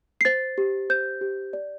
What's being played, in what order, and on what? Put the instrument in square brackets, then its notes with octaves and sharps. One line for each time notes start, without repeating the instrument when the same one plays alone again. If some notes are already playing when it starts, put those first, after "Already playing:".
[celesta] C7
C5 A6
G4
C5 G6
G4
D5